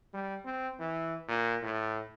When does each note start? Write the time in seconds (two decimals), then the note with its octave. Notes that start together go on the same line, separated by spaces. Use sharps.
0.14 G3
0.45 C4
0.79 E3
1.28 A#2
1.62 A2